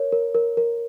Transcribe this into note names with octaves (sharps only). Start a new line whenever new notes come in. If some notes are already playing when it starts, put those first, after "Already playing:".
Already playing: A#4 C#5
A#4
A#4
A#4